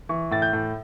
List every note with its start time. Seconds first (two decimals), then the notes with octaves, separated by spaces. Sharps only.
0.09 E3 C#6
0.31 A2 A6
0.42 G6
0.53 A2